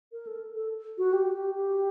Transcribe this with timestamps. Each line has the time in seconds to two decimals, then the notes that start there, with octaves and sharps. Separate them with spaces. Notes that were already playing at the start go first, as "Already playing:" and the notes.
0.12 A#4
0.27 A4
0.55 A4
0.98 F#4
1.13 G4
1.55 G4